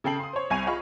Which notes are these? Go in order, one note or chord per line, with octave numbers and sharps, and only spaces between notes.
C#3 A4 G5 C7 F#7
C6 D#6
C5 C#5
C2 G#5 C#6 D#7 F7
F4 G#4 D#5 F5 B5 C#6